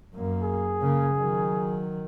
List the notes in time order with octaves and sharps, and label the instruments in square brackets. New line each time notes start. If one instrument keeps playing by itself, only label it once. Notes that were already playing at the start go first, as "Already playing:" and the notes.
[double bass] F#2 A#3
[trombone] G#4
[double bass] C#3 A#3
D#3 F#3